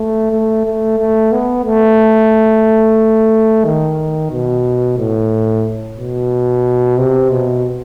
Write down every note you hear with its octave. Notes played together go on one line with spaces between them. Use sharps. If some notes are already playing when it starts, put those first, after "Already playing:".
Already playing: A3
A3
A3
A3
B3
A3
D#3
B2
A2
B2
C3
B2